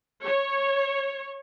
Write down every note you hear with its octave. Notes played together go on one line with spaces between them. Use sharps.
C#5